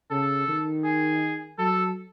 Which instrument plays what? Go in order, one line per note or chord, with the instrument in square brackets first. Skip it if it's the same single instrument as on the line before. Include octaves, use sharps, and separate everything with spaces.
[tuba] C#3 [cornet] A4
[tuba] D#3
[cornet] G#4
[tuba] F#3 [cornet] A4